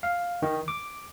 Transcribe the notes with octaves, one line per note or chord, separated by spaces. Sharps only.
F5
D#3
D6